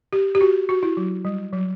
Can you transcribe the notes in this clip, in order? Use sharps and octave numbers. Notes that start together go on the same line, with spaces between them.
G4
G4
F#4
F#4
E4
F#3
G3
F#3